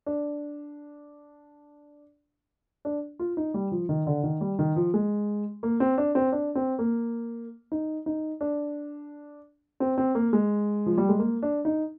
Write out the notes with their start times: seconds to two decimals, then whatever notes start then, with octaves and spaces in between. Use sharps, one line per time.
0.06 D4
2.85 D4
3.19 F4
3.37 D#4
3.54 G3
3.72 F3
3.89 D#3
4.07 D3
4.23 D#3
4.41 G3
4.59 D#3
4.76 F3
4.94 G#3
5.63 A#3
5.80 C4
5.98 D4
6.15 C4
6.32 D4
6.55 C4
6.79 A#3
7.72 D#4
8.06 D#4
8.41 D4
9.80 C4
9.98 C4
10.15 A#3
10.33 G#3
10.86 F3
10.98 G3
11.09 G#3
11.19 A#3
11.43 D4
11.65 D#4